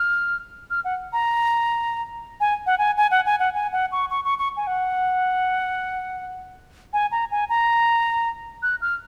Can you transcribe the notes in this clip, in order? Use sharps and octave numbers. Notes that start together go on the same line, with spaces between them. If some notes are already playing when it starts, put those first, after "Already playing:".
Already playing: F6
F6
F#5
A#5
G#5
F#5
G#5
G#5
F#5
G#5
F#5
G#5
F#5
C#6
C#6
C#6
C#6
G#5
F#5
G#5
A#5
G#5
A#5
F#6
F6